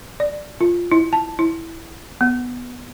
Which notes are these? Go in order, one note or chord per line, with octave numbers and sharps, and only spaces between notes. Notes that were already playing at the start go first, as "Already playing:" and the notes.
D5
F4
E4
A5
E4
B3